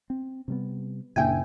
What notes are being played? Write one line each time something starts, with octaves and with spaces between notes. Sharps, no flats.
C4
C3 G3 B3
F#1 A#2 D4 E5 G5 G#5